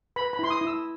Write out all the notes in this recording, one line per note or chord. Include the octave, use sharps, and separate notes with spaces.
B4 B5
B5
E4 C6
D#6
E4
E6